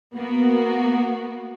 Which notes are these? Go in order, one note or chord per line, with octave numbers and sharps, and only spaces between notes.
A#3 B3 F#4